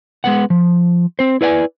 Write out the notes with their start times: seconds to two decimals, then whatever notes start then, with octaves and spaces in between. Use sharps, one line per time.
0.24 G#3 B3 F#5
0.50 F3
1.19 C4 C5
1.41 E4 B4 D5 F#5 G#5